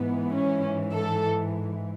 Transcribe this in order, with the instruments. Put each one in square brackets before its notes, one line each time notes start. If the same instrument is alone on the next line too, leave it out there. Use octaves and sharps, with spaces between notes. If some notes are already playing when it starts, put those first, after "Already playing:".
Already playing: [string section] G#2 E3 B3
C#4
A4